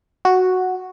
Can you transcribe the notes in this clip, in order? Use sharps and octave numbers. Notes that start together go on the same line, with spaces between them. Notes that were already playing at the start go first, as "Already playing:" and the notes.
F#4